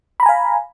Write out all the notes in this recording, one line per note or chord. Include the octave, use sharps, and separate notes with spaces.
F5 G#5 A#5 B5